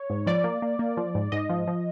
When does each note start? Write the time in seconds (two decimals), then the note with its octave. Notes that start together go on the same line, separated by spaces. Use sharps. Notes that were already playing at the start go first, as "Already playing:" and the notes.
Already playing: C#5
0.10 G#2
0.27 F3 D5
0.44 A#3
0.62 A#3
0.79 A#3
0.97 F3
1.15 G#2
1.32 G#2 D#5
1.50 F3
1.67 F3